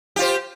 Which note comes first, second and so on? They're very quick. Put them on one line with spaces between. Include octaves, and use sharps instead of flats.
G4 F4 C5